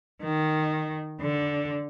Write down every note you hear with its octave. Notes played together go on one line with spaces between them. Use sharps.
D#3
D3